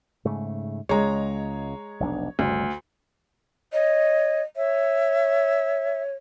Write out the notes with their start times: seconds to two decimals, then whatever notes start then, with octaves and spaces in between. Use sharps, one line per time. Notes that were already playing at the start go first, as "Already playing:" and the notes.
0.25 G#2 C#3 A3
0.89 C#2 G#3 C#5 A#5
2.00 F1 B1 D4
2.39 G1 D2 C#3 G3
3.73 C#5 D#5
4.56 C#5 E5